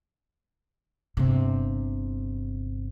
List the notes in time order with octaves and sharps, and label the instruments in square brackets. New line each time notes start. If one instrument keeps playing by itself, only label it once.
[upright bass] G1 C3